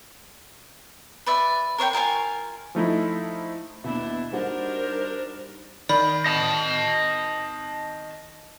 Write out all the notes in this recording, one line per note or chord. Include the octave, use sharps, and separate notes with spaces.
B4 D5 E5
A#4 C#5 F5 G5
F4 A#4 F5 G#5
F3 A3 D#4 E4
D#2 B2 D4 E4
G3 D4 D#4 F#4 A#4 C5 F#5
D#3 D5 B5
D#5 A5